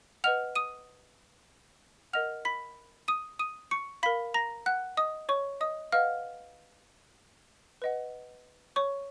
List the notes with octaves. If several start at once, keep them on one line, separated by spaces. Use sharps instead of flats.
B4 D#5 F#5 F6 F7
D#6 D#7
A#4 D#5 F#5 F6 F7
B5 B6
D#6 D#7
D#6 D#7
C#6 C#7
A#4 F5 B5 B6
A#5 A#6
F#5 F#6
D#5 D#6
C#5 C#6
D#5 D#6
B4 D#5 F5 F#5 F6
B4 D#5 F#5
C#5 C#6